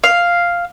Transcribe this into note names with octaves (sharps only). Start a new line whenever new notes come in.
F5